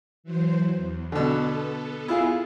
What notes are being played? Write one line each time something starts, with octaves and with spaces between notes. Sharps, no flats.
E3 F#3 C5
E2
B2 D3 B3 A4
E4 F4 G#4